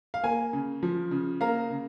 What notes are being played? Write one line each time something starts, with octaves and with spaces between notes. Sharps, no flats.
F5
A#3 G#5
C#3
F3
C#3
A#3 F5 A#5
C#3